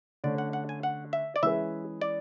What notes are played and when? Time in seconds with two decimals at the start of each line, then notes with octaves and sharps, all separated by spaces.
0.24 D3 A3 C#4 D5
0.38 F#5
0.53 F#5
0.69 G#5
0.83 F#5
1.13 E5
1.36 D5
1.43 E3 G#3 C#4 G#4 B4 E5
2.02 D5